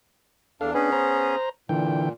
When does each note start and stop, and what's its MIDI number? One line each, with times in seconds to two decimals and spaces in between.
0.61 0.73 40
0.61 0.73 62
0.61 0.71 69
0.61 0.71 77
0.74 1.36 59
0.74 1.36 61
0.74 0.90 62
0.74 1.36 68
0.74 0.90 71
0.92 1.49 72
0.92 1.49 82
1.69 2.12 46
1.69 2.09 50
1.69 2.09 52
1.69 2.09 79